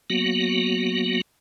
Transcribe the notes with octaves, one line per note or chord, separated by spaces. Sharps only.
F#3 A#3 B3 F#4